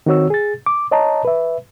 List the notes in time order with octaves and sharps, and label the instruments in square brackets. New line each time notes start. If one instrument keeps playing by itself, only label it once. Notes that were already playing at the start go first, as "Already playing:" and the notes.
[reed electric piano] D#3 C4 F#4 C#5 E6
G#4 A6
D6
C#5 D#5 A5 A#5
B4 E5